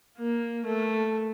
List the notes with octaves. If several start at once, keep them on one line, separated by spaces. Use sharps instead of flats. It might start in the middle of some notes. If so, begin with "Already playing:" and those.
A#3
A3